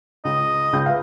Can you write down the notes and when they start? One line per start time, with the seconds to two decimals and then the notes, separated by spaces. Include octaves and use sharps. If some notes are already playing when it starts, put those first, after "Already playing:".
0.25 C#2 D#5
0.73 C#2 G6
0.86 B4 E5 F5